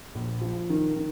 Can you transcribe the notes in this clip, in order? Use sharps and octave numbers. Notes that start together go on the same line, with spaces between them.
A#1
F3
D#3
D#3